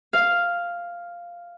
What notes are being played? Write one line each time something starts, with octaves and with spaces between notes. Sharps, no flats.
F5